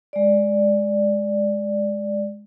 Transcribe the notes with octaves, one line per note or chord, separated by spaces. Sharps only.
G#3 D5